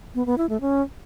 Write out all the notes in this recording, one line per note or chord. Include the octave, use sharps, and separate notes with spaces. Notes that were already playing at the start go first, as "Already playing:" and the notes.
B3
B3
E4
A3
C#4